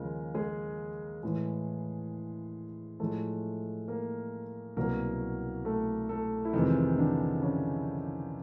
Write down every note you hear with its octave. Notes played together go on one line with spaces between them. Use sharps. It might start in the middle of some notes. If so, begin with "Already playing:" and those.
Already playing: D#2 C#3 F3 G#3 A#3 A#4
G#3 G#4
A2 E3 G#3
A2 F3 G#3 A3 A4
A#3 A#4
C2 B2 F#3 A#3 A#4
A3 A4
A3 A4
E4
F2 C3 D#3 E3 G#3 D#4
D3 D4
C#3 C#4